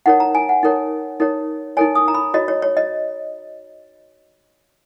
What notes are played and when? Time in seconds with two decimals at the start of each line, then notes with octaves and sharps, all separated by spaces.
0.06 D#4 A#4 C#5 F#5
0.20 A#5
0.35 G#5
0.49 F#5
0.63 D#4 A#4 C#5
1.20 D#4 A#4 C#5
1.77 D#4 A#4 C#5 G#5
1.95 D#6
2.08 A#5
2.14 B5
2.34 F#4 C#5 D#5
2.48 C#5
2.62 C#5
2.77 D#5